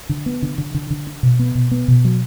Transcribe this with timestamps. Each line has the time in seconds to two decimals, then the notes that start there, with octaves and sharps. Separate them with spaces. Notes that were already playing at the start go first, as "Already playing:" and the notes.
0.09 D3
0.26 B3
0.42 D3
0.58 D3
0.74 D3
0.90 D3
1.07 D4
1.23 B2
1.39 B3
1.55 B2
1.71 B3
1.88 B2
2.05 F#3